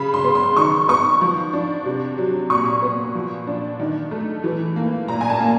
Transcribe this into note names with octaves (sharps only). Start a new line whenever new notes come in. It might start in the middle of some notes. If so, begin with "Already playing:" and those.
Already playing: C#3 B5
C6
B3
C6
D#3 C#6
B3 C#6
F3
D4
C3
F#3
A#2 C#6
B3
F3
D4
D#3
A3
E3
A#3
A#2 A#5
G#5
A5
A#3